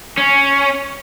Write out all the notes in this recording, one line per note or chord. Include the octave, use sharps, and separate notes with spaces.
C#4